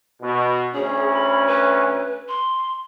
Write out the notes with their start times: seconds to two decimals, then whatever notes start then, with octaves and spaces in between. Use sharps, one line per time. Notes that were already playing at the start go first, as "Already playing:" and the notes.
0.22 B2
0.74 D2 C#4 G#4
1.13 B5
1.47 B4
2.29 C6